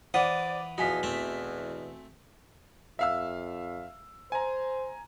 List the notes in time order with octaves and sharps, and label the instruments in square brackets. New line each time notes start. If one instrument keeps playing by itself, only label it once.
[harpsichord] E3 B4 D#6 [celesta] C5 [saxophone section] D5 [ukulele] F#5
[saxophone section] E2 B2 E3 [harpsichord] F3 D#4 [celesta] F#4 G#5 B6
[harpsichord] A3 C4 E5
[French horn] F2 [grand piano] E5 F5 E6
[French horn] C5 [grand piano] G#5 A#5